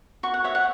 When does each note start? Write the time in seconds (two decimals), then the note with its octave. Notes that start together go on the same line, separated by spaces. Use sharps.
0.23 F#4 C#6
0.34 F#5
0.44 C#5 E5
0.55 F#5